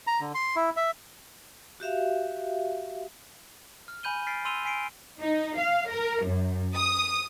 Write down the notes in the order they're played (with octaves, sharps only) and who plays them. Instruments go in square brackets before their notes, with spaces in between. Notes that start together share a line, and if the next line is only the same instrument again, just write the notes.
[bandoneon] A#5
D3
C6
E4
E5
[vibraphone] F#4 G4 E5 F5
[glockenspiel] F6
G#5 B5 G6 D#7 G7
F6 A6 B6 C7 D7
C6 E6 D#7 F7 G7
G#5 B6 C7 D7 G7
[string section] D#4
F5
A#4
F#2
D#6